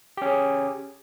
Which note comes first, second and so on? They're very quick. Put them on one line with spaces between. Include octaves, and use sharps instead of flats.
G4 C#4 G#4